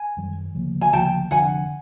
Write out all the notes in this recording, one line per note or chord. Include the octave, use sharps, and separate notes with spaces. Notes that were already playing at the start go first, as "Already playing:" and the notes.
Already playing: G#5
F#2 D#3 G3
D2 C#3 F3 A#3
G#5
D2 C#3 F3 A#3 G5 A5
F1 F2 D3 F#5 G#5